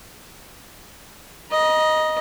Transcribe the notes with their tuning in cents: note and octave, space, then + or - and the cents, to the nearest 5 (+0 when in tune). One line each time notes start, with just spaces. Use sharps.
D#5 +0 A#5 +45